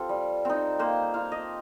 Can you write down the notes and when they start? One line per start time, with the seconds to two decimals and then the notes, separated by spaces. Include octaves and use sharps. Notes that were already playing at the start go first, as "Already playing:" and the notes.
Already playing: C4 F4 G4 A4
0.09 G3
0.45 C4 D#4
0.79 A#3 C5
1.14 F4 F5
1.32 D#5